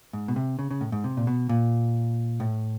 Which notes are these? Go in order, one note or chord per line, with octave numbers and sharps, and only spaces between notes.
G#2
B2
C3
C#3
C#3
A2
G#2
C3
A#2
B2
A#2
A2